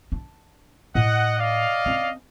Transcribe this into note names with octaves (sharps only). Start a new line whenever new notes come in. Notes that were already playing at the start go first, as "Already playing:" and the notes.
D4
A2 D#5 F#5
D5 D#5 F5
C4 C#4